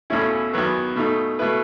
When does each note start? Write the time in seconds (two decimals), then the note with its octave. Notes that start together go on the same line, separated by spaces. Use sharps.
0.10 E2 B2 A3 C#4 E4
0.53 E2 D#3 F#3 B3
0.96 B2 A3 D#4
1.39 B2 A3 E4 B4